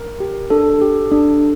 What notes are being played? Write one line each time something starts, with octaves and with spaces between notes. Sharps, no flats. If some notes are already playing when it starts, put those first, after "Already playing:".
Already playing: A#4
G4
D4 A4
G4
D4